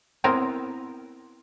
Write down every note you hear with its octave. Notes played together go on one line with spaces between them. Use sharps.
B3 C4 E4 A#4 C5